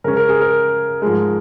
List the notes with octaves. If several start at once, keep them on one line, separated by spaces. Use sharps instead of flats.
C#3 G#3 C#4 A#4
A#4
G#4
A#4
G#2 F3 G#3